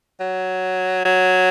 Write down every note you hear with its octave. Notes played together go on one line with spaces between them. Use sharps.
F#3
F#3